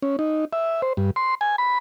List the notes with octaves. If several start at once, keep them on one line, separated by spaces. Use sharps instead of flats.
C#4
D#4
E5
C5
G2
C6
G#5
B5